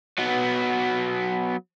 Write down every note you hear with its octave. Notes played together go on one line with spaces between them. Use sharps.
F#3 B3